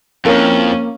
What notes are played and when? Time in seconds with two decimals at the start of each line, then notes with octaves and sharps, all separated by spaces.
0.25 F2 A#3 C#4 E4 A#4